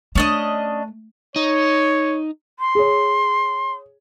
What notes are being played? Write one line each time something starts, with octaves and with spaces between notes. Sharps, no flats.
A3 C#4 D4 D#5
D#4 C#5
C6
G#4 C#5